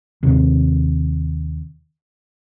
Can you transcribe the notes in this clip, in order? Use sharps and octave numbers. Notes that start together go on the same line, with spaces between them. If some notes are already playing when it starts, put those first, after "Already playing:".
D#2 C3